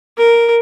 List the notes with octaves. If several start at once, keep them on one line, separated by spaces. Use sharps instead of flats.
A#4